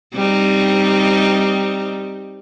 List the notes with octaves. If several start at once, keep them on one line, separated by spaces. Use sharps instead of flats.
G3 C4 D#4